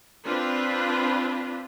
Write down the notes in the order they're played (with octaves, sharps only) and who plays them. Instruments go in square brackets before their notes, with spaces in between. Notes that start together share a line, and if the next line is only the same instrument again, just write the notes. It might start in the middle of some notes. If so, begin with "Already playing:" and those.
[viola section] C4 D4 F4 B4